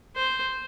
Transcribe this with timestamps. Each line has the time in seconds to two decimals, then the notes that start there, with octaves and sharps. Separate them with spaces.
0.15 C5